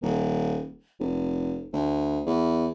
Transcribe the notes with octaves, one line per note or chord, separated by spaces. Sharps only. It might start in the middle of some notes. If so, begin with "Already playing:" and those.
D#1
F1
D2
E2